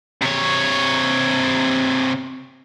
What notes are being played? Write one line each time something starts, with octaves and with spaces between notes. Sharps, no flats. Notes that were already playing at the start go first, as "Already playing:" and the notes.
C3 C#5